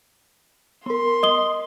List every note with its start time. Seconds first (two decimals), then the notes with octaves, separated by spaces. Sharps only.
0.86 B3 A#4 C6
1.23 D#5 D#6 G7